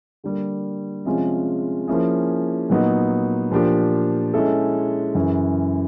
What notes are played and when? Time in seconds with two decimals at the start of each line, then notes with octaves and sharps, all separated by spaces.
0.24 D3 G3 A#3
1.05 C3 F3 G#3 C#4 F4
1.88 F3 A#3 C#4 E4 G#4
2.70 A#2 F#3 B3 D#4
3.51 A#2 F3 A#3 D4 G4
4.34 G#3 C#4 E4 A4
5.15 F#2 C#3 E3